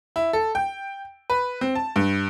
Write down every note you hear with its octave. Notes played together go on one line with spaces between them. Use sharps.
E4
A4
G5
B4
C4
A5
G2